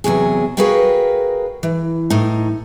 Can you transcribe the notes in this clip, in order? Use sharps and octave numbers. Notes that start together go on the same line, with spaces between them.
E2 C3 F#3 G#4
F#4 G#4 A#4 B4 F5 G5
E3
A2 D#4